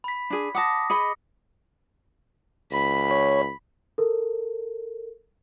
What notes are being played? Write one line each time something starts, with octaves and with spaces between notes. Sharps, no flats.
B5 B6
D4 G#4
F#5 A5 D6 D#6 A#6
G#4 D#5 B5 C#7
C#2 B5
C#5
A4 A#4